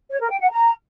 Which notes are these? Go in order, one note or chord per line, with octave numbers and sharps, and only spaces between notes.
C#5
A#4
G5
F#5
A#5